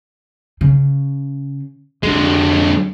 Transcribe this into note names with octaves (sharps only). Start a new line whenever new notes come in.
C#3
F2 D3 G#3